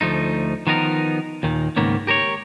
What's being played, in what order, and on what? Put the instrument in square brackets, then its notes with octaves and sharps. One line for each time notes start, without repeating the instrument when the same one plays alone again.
[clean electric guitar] D2 F3 A3 D#4
D#3 F3 B3 D#4 E4 A#4
D#2 A#2 D#3
C#2 G#2 D#3 A#3 B3 C#4
G4 A#4 C5 C#5